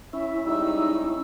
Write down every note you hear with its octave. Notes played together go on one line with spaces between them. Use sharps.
C#4 E4 E5
G3 G#3 D#4 E6